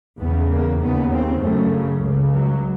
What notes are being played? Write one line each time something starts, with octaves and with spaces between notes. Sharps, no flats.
E2 C#3 B3
A#3
D#2 C#3 B3
C4
F#2 C#3 A3
C#2 C#3
F#3